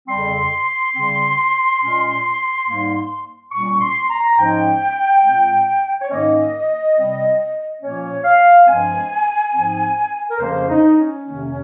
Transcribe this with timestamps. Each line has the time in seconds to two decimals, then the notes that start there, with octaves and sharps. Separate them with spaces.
0.08 F2 C#3 G3 C4 C6
0.95 C#3 G3 C4
1.81 A#2 G#3 C#4
2.66 G#2 G3 A#3
3.52 A#2 G3 A#3 C#4 C#6
3.81 C6
4.10 A#5
4.37 G#2 F3 G#3 C#4 G5
5.23 A#2 G#3 C4
6.02 C#5
6.10 G#2 D#3 A#3 C#4 D#5
6.96 C3 G3 C4
7.82 A#2 F3 A#3 C#4 C#5
8.24 F5
8.67 G2 F3 G#3 C4 G#5
9.54 G#2 F3 C4
10.30 A#4
10.40 F2 C#3 F3 A#3 C#4 C5
10.69 D#4
10.97 C#4
11.25 F2 C3 D#3 A#3